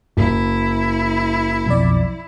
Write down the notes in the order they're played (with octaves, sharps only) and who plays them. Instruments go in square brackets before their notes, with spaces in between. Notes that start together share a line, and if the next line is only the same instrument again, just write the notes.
[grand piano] F#1 [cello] E4
[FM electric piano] B1 F2 D5